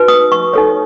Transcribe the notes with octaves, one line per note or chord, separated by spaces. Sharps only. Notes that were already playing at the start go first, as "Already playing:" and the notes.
Already playing: D#4 F#4 B4
D#6
C#6
D#4 A4 C#5